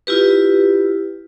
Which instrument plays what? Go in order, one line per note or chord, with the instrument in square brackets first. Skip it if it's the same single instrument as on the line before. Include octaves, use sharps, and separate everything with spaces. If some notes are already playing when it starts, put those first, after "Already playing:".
[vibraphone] E4 F4 G4 B4